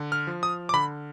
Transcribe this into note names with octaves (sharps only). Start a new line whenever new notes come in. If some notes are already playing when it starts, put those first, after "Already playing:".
Already playing: D3
F6
F3
D#6
D6
D3 B5